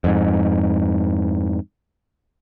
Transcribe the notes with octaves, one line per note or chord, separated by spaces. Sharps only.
F2 G#2